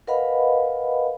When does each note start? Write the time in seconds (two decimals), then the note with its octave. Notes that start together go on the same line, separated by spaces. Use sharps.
0.07 A#4 B4 D#5 F5 F#5 B5